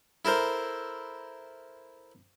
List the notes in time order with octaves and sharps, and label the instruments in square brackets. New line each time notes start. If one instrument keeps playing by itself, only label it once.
[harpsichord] E4 A4 A#4 C5